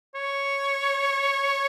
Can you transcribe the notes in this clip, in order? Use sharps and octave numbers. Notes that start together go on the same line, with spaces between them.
C#5